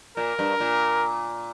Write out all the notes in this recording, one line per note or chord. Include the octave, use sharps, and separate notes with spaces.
A#2 A#4
G2
A#2